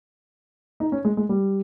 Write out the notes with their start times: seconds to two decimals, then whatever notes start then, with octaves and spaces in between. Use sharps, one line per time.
0.80 D#4
0.92 C#4
1.05 G#3
1.17 G#3
1.29 G3